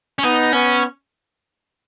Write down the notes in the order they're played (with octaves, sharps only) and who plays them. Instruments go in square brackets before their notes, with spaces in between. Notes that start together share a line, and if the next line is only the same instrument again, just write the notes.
[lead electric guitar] C#4
[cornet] B3 [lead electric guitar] D#4
[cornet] B3 [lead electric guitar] C#4